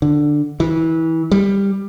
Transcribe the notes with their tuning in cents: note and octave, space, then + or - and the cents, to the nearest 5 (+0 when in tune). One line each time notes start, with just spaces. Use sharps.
D3 +10
E3 -25
G3 +15